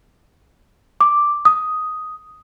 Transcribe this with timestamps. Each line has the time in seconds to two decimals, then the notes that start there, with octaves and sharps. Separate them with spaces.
1.01 D6
1.45 D#6